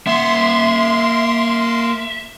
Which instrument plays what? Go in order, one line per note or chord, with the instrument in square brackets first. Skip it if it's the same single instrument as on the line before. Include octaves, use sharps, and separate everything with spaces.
[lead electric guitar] A#3 F#5 [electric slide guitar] E5 [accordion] C6